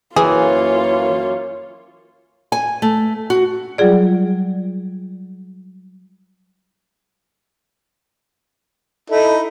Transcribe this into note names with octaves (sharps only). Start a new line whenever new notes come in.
F#2 E3 A#3 F4 G#4 C#5
G#5
A3
F#4
F#3 G3 F4 G#4 D5
D#4 E4 A4